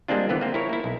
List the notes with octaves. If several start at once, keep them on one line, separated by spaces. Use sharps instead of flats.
G3 G#3 A#3 C4 D4 F4
D3 E3 B3 B4
A#3 C4
E4 A#4 C#5
A#3 E4
B1